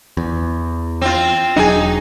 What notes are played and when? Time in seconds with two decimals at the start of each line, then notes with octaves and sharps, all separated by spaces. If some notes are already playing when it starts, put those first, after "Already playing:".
0.17 E2
1.01 C4 F4
1.56 E1 F#3 D4 D#4 G#4